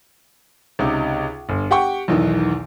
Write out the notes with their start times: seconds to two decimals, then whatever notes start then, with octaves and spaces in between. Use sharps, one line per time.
0.79 C#2 C3 D#4
1.49 G1
1.71 G4 F#5 G5 C#6
2.08 B1 E2 D#3 E3